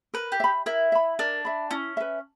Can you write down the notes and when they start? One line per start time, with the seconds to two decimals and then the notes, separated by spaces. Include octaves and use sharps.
0.14 A#4 B4
0.32 G4
0.40 E5 B5
0.66 E4 A#4
0.92 E5 B5
1.19 D4 A#4
1.45 E5 B5
1.71 C#4 E4
1.97 B4 E5